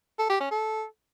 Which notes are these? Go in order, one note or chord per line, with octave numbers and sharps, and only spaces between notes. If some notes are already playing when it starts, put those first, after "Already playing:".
A4
G4
C#4
A4